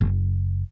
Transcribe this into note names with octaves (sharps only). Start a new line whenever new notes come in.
F#1